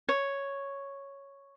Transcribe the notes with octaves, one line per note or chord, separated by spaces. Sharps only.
C#5